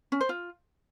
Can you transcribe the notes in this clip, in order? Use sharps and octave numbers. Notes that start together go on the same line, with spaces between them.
C#4
C5
F4